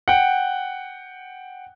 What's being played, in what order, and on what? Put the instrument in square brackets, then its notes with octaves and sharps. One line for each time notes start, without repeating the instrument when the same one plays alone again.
[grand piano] F#5 G5